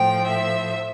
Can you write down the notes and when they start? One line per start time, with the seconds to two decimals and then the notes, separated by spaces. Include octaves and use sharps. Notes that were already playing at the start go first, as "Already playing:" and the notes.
Already playing: A2 F3 G5
0.27 E5